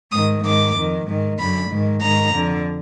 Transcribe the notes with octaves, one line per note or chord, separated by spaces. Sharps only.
G#2 D#3 D#6
G#2 D#3 D6
F2 D#3
G#2 D#3
F#2 D3 B5
G#2 D#3
G#2 D#3 A#5
F2 D3